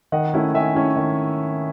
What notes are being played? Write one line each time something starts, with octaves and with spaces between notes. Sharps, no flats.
D#3 D#5 F#5
A3 C#4 E4
D#3 E5 G#5
A3 C#4 E4
D#3